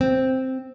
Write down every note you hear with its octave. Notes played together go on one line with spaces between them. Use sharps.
C4